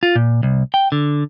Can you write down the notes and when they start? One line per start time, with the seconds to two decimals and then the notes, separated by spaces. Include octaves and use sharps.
0.03 F4
0.16 A#2
0.43 C2
0.74 G5
0.92 D3